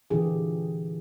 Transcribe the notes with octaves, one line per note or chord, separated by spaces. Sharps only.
A#2 D3 E3 D4 G4 G#4